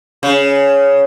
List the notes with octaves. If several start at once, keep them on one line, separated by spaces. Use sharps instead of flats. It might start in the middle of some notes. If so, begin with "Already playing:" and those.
C#3